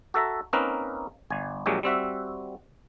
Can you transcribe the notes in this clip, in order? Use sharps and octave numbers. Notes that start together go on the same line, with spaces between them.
F#4 A4 E5 A#5
A#3 C4 C#4 D#4 A#4 B4
G1 G#5
A#1 A#2 F#3 G#3 F#4 G4
G3 C4 F#4 E5